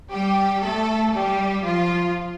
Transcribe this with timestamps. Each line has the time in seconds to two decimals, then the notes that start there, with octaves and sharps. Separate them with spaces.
0.11 G3 G4
0.62 A3 A4
1.13 G3 G4
1.64 F3 F4